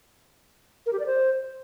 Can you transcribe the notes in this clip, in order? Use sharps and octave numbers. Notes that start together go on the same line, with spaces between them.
A#4
G4
D5
C5